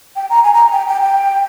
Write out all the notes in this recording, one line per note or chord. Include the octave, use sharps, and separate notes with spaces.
G5
A#5
G#5
A#5
G5
G5
G5